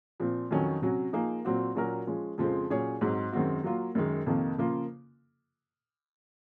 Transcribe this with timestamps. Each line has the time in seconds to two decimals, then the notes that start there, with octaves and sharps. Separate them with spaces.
0.20 A#2 F3 C4
0.51 F2 D#3 F#3 C#4
0.82 C3 F#3 C#4 F#4
1.13 F3 A#3 D#4 G#4
1.45 A#2 F#3 C4 F#4
1.75 A#2 F#3 C#4 F#4 A#4
2.07 F3 G#3 C#4
2.38 F2 C#3 F3 G#3 C4
2.70 A#2 F#3 C#4 G#4 C#5
3.01 G#2 F#3 C4
3.32 F#2 D#3 G#3 C4 F#4
3.64 F#3 A#3 F4
3.95 F#2 D#3 G#3
4.27 F2 C3 D#3 A#3
4.58 C#3 F3 A#3 F4